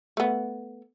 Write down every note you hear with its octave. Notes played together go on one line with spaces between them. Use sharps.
A3 B3